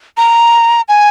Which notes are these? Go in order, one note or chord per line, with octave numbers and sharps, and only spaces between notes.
A#5
G#5